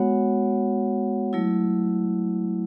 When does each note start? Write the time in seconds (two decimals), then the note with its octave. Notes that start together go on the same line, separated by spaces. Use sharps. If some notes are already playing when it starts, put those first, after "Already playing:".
Already playing: G#3 B3 F#4 C#5 F#5
1.33 F#3 A3 E4